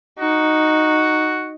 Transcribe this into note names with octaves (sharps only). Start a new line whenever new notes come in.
D#4 F#4